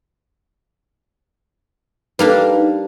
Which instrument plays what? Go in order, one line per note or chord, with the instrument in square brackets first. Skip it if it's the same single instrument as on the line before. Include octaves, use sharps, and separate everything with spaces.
[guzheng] G3 A#3 D4 [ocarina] D#4 [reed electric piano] B4